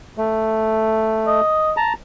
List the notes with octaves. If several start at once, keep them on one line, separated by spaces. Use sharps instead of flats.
A3
D#5
A5 A#5